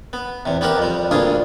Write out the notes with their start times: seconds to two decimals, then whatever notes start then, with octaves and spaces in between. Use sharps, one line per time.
0.13 B3
0.46 E2 C3
0.61 B3 C4 G4 A#4 F#5
0.78 F2 G3
1.11 D2 G2 A#3 F4 G#4